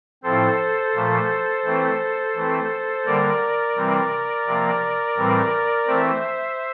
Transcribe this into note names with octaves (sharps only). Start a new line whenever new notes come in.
A2 F3 C4 A4 C5
A#2 F3 A3
E3 A3 C4
E3 A3 C4
D3 G3 A#3 A#4 D5
C3 E3 G3 C4
C3 F3 A#3
A2 E3 G3 C4
E3 A3 C4 C5 E5